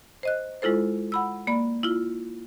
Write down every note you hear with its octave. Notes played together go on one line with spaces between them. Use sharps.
C5 D#5 F#6
G#3 E4 F4 A4 C5
F#5 B5 E6
A#3 D5 B5
E4 F4